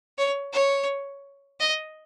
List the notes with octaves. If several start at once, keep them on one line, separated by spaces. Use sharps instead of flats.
C#5
C#5
D#5